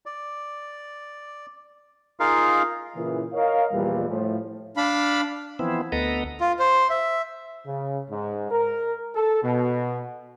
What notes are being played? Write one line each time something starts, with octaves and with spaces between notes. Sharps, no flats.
D5
D#4 F4 G#4 A#4 F5
A#2 C#3 E3
A#4 C#5 D#5 F5
E2 A#2 E3 F3 G3
A2 F3
D4 F5 B5
E3 F3 B3 C4 E4
D2 B3 A4 B4 D#5 A#5
F4
C5
E5
C#3
G#2
A#4
A4
B2